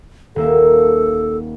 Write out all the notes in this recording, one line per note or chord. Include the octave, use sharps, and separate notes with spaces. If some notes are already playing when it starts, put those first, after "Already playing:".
D#1 A#3 A4 E5